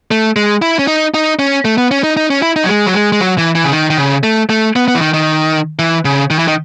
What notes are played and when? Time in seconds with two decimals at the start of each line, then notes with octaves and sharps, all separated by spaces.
0.11 A3
0.36 G#3
0.62 E4
0.79 C#4
0.87 D#4
1.14 D#4
1.39 C#4
1.65 A3
1.78 B3
1.91 C#4
2.04 D#4
2.17 D#4
2.30 C#4
2.42 E4
2.56 D#4
2.64 F#3
2.69 G#3
2.86 F#3
2.94 G#3
3.12 G#3
3.21 F#3
3.38 E3
3.55 E3
3.64 C#3
3.72 D#3
3.90 D#3
3.98 C#3
4.23 A3
4.50 A3
4.76 B3
4.88 B3
4.95 E3
5.01 D#3
5.14 D#3
5.79 E3
6.05 C#3
6.30 D#3
6.39 E3
6.48 D#3